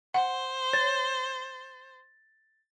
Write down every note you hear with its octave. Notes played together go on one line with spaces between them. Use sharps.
C5 F#5
C#5 A6